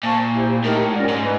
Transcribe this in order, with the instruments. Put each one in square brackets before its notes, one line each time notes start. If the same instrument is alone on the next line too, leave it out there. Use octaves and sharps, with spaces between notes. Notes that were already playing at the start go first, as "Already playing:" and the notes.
[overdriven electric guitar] A#2 [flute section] C5 F5 A5 C#6
[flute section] E4 G4 C5
[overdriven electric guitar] A2 [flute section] D#4 G4 A#4
[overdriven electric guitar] G#2 [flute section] C#4 F4 A#4 D5
[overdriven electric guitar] G#2
[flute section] B4